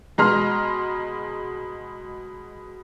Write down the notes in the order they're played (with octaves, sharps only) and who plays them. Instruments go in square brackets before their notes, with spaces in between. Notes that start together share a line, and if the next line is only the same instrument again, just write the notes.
[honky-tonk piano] B2 G#3 A#5 C6 F6